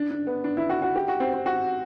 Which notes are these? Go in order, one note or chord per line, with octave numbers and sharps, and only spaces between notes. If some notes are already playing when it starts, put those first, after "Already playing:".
Already playing: D4
D4
B3
D4
E4
F#4
F#4
G4
F#4
C4
C4
F#4